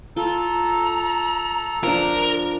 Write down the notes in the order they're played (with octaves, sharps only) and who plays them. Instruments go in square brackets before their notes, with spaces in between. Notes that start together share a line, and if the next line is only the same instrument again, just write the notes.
[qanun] F4 [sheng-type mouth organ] A4 [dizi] A#5
[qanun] F3 D4 [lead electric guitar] A#4